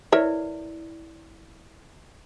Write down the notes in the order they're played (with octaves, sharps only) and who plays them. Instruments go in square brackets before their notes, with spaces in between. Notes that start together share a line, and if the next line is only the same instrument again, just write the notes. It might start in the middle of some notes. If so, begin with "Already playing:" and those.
[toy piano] E4 B4 D5 [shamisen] A#4 C#5 E5